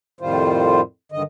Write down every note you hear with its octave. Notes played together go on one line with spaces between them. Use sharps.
F2 A2 D#3 G3 F4 C5
G2 D3 D#3 D#5